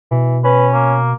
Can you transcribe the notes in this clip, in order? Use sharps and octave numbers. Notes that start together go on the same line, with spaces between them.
B2 E3
C#4 B4
A#3